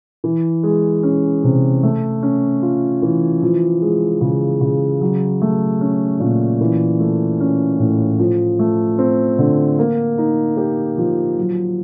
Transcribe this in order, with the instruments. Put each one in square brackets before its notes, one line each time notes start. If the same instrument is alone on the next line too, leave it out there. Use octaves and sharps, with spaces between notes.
[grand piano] E3
G#3
C#4
C3
A3
C#4
F4
E3
F3
G#3
C#3
C#3
F#3
A3
C#4
A#2
E3
A3
C#4
A2
F3
A3
C4
D3
A#3
D#4
G4
F3
F#3